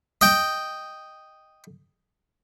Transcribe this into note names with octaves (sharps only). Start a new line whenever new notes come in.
D#5 G5